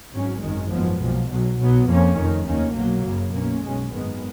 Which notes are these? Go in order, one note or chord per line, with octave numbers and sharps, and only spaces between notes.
G#1 G#2 F#3 C#4
G#1 F#2 D#3 G#3
G#1 F#2 F3 G#3 B3
B1 A#2 F3
B1 B2 F#3
B1 B2 F#3 B3
F2 F3 A#3 C#4
F1 F2 D#3
D#2 D#3 A#3 C#4
B1 B2 F#3 A#3
F#1 F#2 C#3
B1 B2 A#3 C#4
B1 B2 G#3 C#4
G#1 F#2 D#3 G#3 B3